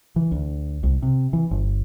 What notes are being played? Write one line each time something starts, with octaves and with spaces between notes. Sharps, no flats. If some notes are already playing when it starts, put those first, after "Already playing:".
E3
D2
C2
C3
E3
G1